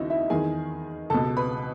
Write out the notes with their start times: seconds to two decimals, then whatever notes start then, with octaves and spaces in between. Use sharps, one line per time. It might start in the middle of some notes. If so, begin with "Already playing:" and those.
Already playing: D#2 C#3 D#4 E4 F#4 D#5 E5
0.10 E4 E5
0.30 E2 D#3 G#4 G#5
1.10 C#2 B2 A4 A5
1.37 B4 B5